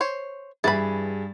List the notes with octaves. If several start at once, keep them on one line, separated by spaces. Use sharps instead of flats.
C5 C#5
G2 E3 F#4 G#4 B5 A6